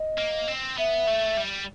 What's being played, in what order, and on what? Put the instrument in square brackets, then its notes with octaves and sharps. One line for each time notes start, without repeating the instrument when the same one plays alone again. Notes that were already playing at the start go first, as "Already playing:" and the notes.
Already playing: [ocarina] D#5
[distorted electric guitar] A#3
C4
[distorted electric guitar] B3 [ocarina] E5
[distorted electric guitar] A3
G3